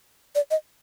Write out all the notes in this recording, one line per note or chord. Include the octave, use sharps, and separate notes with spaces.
D5
D#5